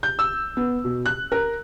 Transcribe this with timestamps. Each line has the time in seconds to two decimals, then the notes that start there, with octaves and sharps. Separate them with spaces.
0.03 G6
0.19 E6
0.57 B3
0.84 B2
1.06 F#6
1.32 A#4